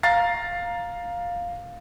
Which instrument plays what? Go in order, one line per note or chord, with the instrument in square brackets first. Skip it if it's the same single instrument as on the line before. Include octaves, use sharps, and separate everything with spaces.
[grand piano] F5 A#5 A6 C7